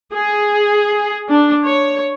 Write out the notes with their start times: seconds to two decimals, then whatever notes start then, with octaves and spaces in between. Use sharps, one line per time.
0.13 G#4
1.30 D4
1.67 C#5